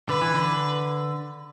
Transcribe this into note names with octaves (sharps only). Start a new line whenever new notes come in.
D3 B4
E3
D3